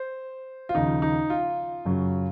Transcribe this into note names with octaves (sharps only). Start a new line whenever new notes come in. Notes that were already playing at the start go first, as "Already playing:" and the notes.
Already playing: C5
F4
D#2 C#3 F3 D#4
D#4
F4
F#2 C#3 F#3